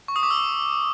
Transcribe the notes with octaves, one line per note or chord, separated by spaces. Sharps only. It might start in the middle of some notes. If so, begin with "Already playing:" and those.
C#6
D#6
D6
E6